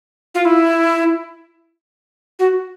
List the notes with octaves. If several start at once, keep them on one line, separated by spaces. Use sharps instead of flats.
F4
E4
F#4